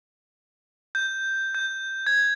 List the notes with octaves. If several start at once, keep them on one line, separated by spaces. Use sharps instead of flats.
G6
G6
G#6